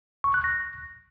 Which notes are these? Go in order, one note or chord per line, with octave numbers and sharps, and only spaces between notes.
C#6
F#6
A#6